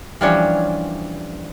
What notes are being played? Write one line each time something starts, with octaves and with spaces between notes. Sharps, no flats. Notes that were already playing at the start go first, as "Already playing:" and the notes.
E3 F3 G3 C#4 D4 C#5